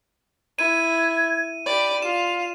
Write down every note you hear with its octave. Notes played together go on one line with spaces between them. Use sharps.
E4 G#6 D#7
G4 D5 B5
F4 F5 E7